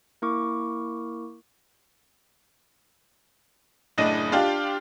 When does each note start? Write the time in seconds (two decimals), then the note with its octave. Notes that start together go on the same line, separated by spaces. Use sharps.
0.22 A#3 E4 A#4 C#6 D6
3.98 F#1 A2 D4 D#5 D#7
4.32 D4 F4 G4